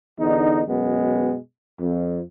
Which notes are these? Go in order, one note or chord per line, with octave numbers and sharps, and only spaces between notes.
E2 D3 D#4
F#2 B2 G#3 B3
F2